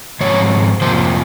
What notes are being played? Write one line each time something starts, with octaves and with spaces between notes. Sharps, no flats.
G#2 F3 C4 C#5
F2 C3 F3 A#3 C5